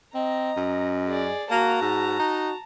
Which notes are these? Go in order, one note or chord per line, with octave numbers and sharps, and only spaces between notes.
C4 D#5 A#5
F#2
G#4 D5
A#3 F#4 A5 A#5
G#2
D#4